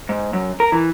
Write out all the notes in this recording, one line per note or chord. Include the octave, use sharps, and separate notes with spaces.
G#2
F#2
A#4
E3